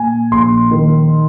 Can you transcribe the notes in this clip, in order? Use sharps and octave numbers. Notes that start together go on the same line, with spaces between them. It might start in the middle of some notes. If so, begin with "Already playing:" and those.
Already playing: A#2 G#5
A#1 C6
D#3